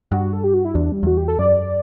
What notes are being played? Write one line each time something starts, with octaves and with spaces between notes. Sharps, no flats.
G2 F#4
A4
G4
F#4
E4
E2 D4
G3
E2 F#4
G4
A4
F#2 D5